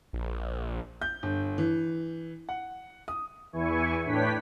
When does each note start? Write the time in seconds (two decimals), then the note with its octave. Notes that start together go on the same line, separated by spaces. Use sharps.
0.13 A#1
1.02 G6
1.23 G1
1.58 E3
2.49 F#5
3.08 D#6
3.53 E2 E3 E4 G#5 C#6
4.05 A2 D4 B4 C#5 G5 B6